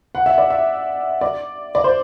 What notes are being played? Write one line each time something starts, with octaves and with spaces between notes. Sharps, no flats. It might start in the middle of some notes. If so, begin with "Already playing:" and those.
F#5
E5
D5
E5
D5
D5
C5